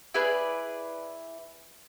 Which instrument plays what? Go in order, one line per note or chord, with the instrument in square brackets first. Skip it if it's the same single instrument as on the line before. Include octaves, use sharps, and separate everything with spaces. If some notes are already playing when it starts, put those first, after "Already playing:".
[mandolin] E4 G#4 B4 D5